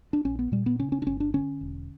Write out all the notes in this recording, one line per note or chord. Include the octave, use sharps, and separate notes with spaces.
D4
A#1 C#4
B3
A#2 G3
B3
C#3 C#4
C#4
D4
G1 C#4
D4
D3 C#4
E1